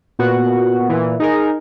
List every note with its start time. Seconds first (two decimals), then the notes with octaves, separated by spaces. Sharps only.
0.19 A#2 B3 F#4 F#5
0.89 A#2 E3
1.20 D#4 G#4 A#4